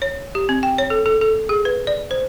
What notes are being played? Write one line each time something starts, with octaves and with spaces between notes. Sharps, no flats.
C#5
G4
C4
G5
C#5
A4
A4
A4
G#4
B4
D5
C5